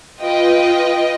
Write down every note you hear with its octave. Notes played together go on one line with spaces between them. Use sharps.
F4 B4 D#5 G5